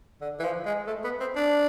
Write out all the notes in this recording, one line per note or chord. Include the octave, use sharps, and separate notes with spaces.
D3
E3
F3
G#3
A3
B3
C4
D4